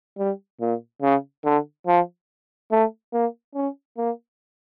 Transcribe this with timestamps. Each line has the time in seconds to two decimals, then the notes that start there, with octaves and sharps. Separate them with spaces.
0.18 G3
0.61 A#2
1.02 C#3
1.45 D3
1.87 F3
2.71 A3
3.13 A#3
3.55 C#4
3.97 A#3